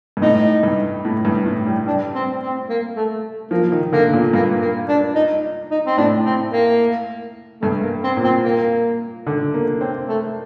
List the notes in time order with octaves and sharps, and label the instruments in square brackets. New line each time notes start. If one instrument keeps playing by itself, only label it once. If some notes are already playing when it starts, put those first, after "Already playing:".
[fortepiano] G2
[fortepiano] A2 [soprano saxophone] D#4
[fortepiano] G2
A2
G2
A2
G3
[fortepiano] G3 [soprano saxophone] D4
[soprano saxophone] C4
C4
A#3
A3
[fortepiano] F3 [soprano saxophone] A#3
[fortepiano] D#3
[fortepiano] D3 [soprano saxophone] A#3
[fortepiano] A#2
[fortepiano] G2 [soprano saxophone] A#3
[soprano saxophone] A#3
D4
D#4
D#4
C4
[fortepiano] A2 [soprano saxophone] D4
[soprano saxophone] C4
A#3
[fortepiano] G2 [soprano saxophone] A3
[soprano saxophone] A#3
C4
[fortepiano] A#2
[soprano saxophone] C4
A#3
[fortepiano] D3
A#3
C4
[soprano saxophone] A3